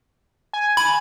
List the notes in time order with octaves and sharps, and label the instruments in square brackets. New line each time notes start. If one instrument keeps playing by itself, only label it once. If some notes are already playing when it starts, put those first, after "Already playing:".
[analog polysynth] G#5
[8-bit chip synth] B5